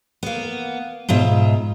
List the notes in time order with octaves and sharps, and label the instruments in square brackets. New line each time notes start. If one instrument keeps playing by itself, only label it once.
[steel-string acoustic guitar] A#3 B3
G#2 B2 F4 E5